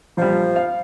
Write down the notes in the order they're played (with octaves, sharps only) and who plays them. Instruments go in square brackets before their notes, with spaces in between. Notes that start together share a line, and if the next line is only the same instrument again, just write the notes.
[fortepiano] A#1 G3 [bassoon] F3
[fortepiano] F5